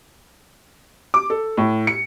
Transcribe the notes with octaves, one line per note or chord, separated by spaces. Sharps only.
D6
A4
A2
C#7